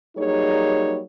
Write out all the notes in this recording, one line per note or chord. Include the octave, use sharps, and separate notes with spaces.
F#3 G3 A#3 D#4 G#4 C#5